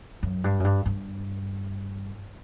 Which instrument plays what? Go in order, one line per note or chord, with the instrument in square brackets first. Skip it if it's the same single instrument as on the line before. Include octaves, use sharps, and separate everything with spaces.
[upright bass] F#2
G2
F#2
G2
G2